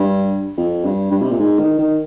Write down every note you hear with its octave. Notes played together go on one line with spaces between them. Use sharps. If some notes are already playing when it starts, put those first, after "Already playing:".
Already playing: G2
F2
G2
G2
C3
A#2
G#2
D#3
D#3